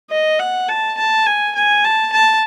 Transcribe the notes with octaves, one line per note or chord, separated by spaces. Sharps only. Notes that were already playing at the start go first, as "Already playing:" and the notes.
D#5
F#5
A5
A5
G#5
G#5
A5
A5